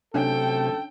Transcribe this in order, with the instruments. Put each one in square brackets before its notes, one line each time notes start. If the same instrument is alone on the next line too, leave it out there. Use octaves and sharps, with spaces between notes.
[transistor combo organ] C3 F#3 A3 [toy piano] C#4 D4 C#5 [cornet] A4 [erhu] G5